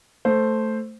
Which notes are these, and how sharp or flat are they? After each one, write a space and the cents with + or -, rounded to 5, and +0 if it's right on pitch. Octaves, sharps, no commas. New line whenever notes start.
A3 +0 C5 +0